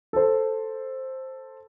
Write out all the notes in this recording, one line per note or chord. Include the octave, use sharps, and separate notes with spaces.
A4 C5